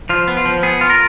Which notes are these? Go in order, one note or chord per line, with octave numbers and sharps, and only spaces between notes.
F3 F4
B3
F4
F3
B3 G#4
F4
A#4